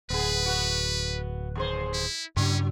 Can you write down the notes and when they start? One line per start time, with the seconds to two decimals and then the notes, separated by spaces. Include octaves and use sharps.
0.10 D1 B3 G#4 B4
0.46 B3 F#4
1.55 D#2 G#4 C5
1.94 E4
2.37 G2 C#3 F#3 C#4 D4